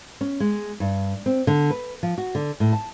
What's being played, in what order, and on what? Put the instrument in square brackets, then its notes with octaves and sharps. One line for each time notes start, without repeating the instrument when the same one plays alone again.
[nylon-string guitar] C#4
G#3
G2
C4
D3
B4
F3
F#4
D3
A2
A5